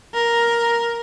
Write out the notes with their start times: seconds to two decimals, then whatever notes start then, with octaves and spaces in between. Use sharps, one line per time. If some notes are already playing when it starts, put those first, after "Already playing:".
0.14 A#4